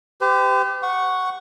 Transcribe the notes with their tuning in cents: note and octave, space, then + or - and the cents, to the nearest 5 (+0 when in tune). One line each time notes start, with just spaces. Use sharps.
G4 +0 C5 -45
F#5 +0 C#6 +0